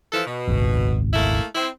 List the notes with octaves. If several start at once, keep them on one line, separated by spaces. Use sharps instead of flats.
E3 F3 A4
B2
D#1 G#1 C#2
A3 A#3 E4
C4 E4